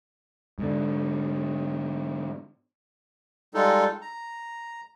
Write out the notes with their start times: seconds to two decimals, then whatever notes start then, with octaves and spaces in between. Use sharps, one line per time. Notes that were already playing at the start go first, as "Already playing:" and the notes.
0.59 G#2 D3
3.54 G3 G#3 D#4 F4 A4
4.01 A#5